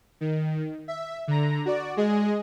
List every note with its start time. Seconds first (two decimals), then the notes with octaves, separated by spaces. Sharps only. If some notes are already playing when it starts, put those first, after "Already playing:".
0.21 D#3
0.88 E5
1.28 D3 A#5
1.66 F#4 D5
1.97 G#3 G#4 D#5